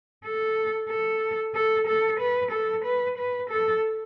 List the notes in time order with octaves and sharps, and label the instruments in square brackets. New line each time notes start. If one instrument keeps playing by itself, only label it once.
[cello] A4
A4
A4
A4
B4
A4
B4
B4
A4